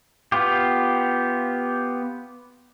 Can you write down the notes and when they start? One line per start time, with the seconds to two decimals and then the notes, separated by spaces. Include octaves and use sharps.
0.32 B3 F4 G4